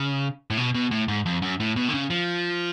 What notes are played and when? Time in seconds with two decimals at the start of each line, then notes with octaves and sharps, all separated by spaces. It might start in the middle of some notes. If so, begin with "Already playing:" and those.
Already playing: C#3
0.50 A2
0.57 B2
0.74 B2
0.91 A2
1.08 G#2
1.26 F2
1.42 F#2
1.60 A2
1.76 B2
1.89 D3
1.94 C#3
2.10 F3